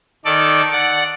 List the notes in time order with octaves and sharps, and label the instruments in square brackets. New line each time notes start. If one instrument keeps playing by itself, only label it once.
[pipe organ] D#3 A4 D5 D6
D5 F#5